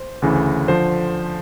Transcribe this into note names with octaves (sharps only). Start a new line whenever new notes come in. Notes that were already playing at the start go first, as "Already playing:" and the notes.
Already playing: C5
D2 C#3 E3
D3 F3 C5